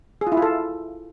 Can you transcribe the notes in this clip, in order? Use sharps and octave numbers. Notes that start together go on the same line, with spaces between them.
G#4
F4
E4
F4
A4